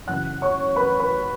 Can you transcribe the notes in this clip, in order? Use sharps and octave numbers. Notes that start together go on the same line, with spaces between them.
F#2 C#3 E3 F#5 F#6
C#5 C#6
B4 B5
B4 B5